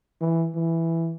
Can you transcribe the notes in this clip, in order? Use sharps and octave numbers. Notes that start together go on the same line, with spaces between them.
E3
E3